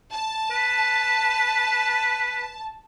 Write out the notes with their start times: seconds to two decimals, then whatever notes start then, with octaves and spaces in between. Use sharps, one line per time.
0.13 A5
0.51 B4